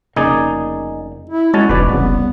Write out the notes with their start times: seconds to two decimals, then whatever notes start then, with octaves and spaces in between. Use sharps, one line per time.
0.16 F1 C#3 A#3 D#4 G#4 D5
1.30 E4
1.54 G#3 C#4 F#4 C#5 A5
1.69 E1 C#2 G#2 B2 E3 B4 D5
1.89 F1 C2 C#3 B3